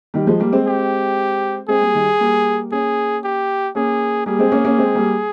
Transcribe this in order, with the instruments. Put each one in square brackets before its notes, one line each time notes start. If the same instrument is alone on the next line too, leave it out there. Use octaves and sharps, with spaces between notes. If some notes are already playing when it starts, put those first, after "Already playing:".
[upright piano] D#3 G3
F3 G#3
G3 A#3
G#3 C4
[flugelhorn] G4
[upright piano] G#3 C4 [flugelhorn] G#4
[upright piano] G3 A#3
D#3 G3
G3 A#3
[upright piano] A#3 C#4 [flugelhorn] G#4
[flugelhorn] G4
[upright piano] A#3 C#4 [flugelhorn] G#4
[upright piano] G3 A#3 [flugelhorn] G#4
[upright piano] G#3 C4
A#3 C#4
A#3 C#4
G#3 C4
G3 A#3